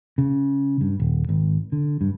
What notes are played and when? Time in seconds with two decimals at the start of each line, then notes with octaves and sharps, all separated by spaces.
0.18 C#3
0.81 G2
1.00 D#1
1.29 G#1
1.72 D3
2.01 G2